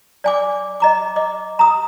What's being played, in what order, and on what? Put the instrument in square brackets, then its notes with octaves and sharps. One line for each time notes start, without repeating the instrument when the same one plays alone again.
[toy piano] D5 G#5 D6
D#5 A#5 D6
D#5 D6
A#5 D#6